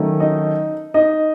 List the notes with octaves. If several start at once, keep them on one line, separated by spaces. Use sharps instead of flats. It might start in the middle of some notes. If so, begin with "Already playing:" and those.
Already playing: D#3 F#3 A3 C#4
D#4 D#5
D#4 D#5